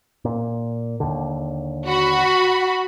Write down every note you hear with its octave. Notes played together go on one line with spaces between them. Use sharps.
A#2
D#2 D3
F#4 B5